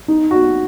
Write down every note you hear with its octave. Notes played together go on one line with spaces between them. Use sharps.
D#4
F#4